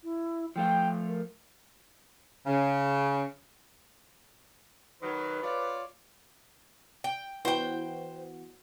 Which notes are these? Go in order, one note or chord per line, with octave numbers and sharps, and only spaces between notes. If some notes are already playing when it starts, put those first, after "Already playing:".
E4
F3 A3 F4 G5
A#4
C#3
D#3 F#3 B4
F4 C#5 D5
G5
E3 B3 F#4 C5 G5